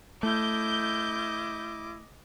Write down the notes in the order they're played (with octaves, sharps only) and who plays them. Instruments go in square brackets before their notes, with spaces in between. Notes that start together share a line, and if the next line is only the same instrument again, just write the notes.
[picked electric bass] A3 [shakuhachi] E4 [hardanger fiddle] D#5 D6 [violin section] G6